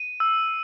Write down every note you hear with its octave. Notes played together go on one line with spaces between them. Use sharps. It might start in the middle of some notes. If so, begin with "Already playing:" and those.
Already playing: D#7
E6